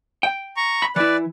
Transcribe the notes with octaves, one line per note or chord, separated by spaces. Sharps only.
G5
A#5 C#6
B5
E3 E4 B4 D5